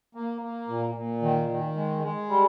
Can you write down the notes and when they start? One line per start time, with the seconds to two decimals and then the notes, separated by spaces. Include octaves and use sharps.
0.15 A#3
0.41 A#3
0.68 A#2
0.95 A#2
1.22 D#3
1.48 D#3
1.76 G#3
2.02 G#3
2.29 G3